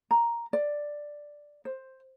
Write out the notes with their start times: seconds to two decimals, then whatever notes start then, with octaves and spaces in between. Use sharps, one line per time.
0.11 A#5
0.53 D5
1.65 C5